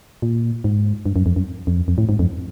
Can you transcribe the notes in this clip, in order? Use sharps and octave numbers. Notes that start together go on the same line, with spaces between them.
A#2
G#2
G2
F#2
F2
F#2
F2
F2
A2
G#2
F2